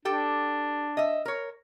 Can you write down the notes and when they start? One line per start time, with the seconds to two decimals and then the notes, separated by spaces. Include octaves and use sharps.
0.05 D4 G4 A4 G5
0.97 D#5 E5
1.26 A#4 C#5